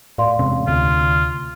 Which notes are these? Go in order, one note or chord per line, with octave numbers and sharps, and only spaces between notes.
A2 D5 F5 C6
E1 C3 C4 C#4
D2 C3 F4
F6